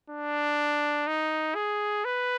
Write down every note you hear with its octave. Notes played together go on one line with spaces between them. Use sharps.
D4
D#4
G#4
B4